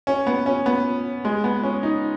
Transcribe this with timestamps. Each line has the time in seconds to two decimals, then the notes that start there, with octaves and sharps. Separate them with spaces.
0.07 C#4
0.27 B3
0.46 C#4
0.66 B3
1.25 G#3
1.44 B3
1.63 C#4
1.83 D#4